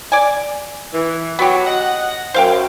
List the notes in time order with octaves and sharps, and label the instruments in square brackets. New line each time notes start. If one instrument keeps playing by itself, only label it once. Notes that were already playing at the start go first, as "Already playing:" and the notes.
[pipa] D5 G#5
[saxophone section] E3
[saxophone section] F#3 [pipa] B3 G4
[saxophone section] D#5 F#5
[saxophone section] F#2 [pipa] C5 F5 G5